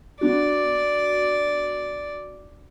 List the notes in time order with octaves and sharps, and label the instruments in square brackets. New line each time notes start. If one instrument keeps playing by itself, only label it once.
[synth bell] B3 D4 F#4 [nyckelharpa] D5